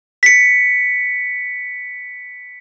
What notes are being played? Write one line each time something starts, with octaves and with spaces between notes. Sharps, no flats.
B6 C#7